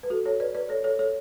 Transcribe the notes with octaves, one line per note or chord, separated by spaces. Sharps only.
B4
F#4 A4
A4 C#5
B4 D5
B4 D5
A4 C#5
A4 C#5
A4 C#5